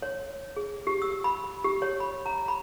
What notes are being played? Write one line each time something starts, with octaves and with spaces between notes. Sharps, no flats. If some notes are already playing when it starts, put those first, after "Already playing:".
C#5
G#4
G4
E6
B5
G4
C#5
B5
A#5
B5